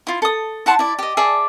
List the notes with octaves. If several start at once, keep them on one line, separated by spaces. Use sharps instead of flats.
E4 F4
A4 D#6
E4 F#5 A5 C6
E4 D5
G4 D#5
G#4 D5 E5 A5